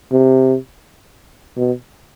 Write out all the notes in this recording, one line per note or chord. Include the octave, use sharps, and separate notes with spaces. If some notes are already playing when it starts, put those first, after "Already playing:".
C3
B2